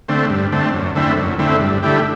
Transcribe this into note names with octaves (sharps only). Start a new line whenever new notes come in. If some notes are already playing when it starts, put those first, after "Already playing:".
D3 A3 C4
G2
D3 A3 C4
F#2
D3 A3 C4 E4
F#2
D3 A3 C4 E4
G2
D3 A3 E4 G4